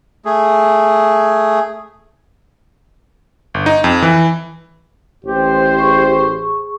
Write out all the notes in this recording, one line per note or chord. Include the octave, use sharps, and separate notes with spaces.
A3 G#4
G1
D#4
F2
E3
A1 G4 C5
G#4 C#6